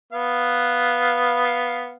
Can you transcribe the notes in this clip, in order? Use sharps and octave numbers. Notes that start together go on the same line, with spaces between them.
B3 F5